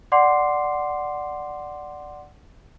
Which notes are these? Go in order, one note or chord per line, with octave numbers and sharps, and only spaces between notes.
D5 F#5 C6 D6 C7